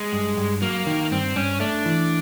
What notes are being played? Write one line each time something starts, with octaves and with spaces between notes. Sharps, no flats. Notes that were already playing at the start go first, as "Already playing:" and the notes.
Already playing: G#3
G2
G2
F#3 A#3
D#3
G2 C4
G2 C#4
A3 D4
E3